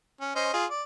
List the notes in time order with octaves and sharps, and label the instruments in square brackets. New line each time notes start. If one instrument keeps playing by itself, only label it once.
[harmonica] C#4
C#4 C5 D#5
F4 G#4
D5